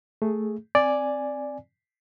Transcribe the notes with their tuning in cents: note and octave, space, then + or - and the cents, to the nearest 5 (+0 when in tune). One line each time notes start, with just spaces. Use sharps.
A3 +0 G#4 +0
C4 +0 D5 +0 G#5 +0